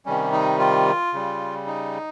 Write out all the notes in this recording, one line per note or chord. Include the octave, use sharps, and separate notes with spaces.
C3 D#3 G3 C#4
D#4
F4
C#3 G3
D#4